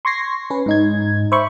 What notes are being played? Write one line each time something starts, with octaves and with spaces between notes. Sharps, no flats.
C6 C#6 G#6 A#6 C7
C#4 B4
G#2 D#4 G#6
C5 E5 B5 C#6